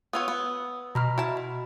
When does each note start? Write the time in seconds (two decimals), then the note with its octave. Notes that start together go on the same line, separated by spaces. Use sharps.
0.13 B3 F4 C#5 D#6 E6
0.28 B3
0.95 B2 A#5 B5 F6
1.18 E4 F#4 A5
1.37 B5